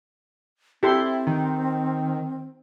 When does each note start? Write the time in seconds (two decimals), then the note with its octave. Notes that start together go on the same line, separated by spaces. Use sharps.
0.83 C4 E4 G4 A4 C6
1.27 D#3